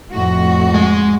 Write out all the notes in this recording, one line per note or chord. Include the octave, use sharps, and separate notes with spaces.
F2 A2 F#4
G#3